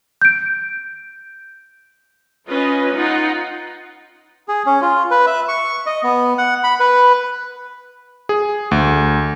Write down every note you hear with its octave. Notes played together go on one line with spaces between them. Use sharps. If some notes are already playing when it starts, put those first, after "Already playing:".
G6 D7
C#4 F4 B4 D#5
D#4 F4 F#5
G#4
C#4
F4
B4
E5
C#6
D#5
B3
F#5
B5
B4
G#4
D2